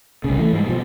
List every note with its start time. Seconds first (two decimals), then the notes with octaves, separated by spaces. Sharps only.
0.24 C2 C#3
0.38 E3 A3
0.53 G#2 G3
0.66 B2 F3